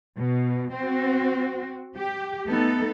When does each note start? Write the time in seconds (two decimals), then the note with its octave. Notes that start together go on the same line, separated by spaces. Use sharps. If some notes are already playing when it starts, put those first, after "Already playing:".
0.18 B2
0.75 C4 F#4
1.96 G4
2.46 A3 B3 D#4 A4